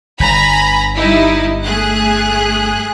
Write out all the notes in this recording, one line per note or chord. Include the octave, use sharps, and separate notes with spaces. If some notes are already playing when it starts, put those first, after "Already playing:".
G1 G#5 A#5 B5
G3 D#4 E4
A3 G#4 F#6